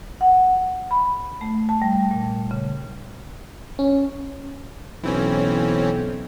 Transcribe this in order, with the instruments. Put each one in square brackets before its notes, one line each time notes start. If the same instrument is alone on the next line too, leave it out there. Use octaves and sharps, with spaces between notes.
[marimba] F#5
B5
A3
A5
G3
A#2
C#3
[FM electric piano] C#4
[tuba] B1 [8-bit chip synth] E3 C4 C#4